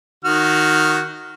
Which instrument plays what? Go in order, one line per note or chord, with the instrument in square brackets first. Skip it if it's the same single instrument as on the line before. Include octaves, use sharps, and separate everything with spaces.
[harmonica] D#3 F#4 F6